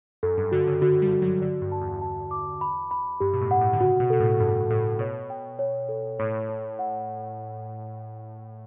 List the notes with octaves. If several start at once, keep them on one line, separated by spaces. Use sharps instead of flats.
F#2 A4
G2
D3 F#4
C#3
D3 F#4
G3
F#4
F#3
D3 D5
G2
A5
E2
A5
D6
B5
B5
G2 G4
B2
A2
F#5
A2
D3
C#3 F#4
B2
B2 A4
A2
G2 A4
A2 A4
B2 C#5
G5
C#5
A4
A2 C#5
C#5
F#5